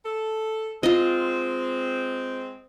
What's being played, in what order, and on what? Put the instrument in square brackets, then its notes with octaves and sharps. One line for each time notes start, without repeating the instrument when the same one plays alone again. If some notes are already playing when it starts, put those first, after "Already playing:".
[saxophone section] A4
[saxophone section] G#3 C4 [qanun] F4 D#5